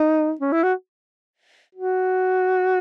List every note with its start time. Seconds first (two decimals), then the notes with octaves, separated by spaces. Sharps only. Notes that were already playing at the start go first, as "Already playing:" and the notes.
Already playing: D#4
0.41 C#4
0.52 E4
0.63 F#4
1.75 F#4